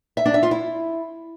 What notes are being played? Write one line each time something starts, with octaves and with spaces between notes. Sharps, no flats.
E5
D4
E5
F4
E4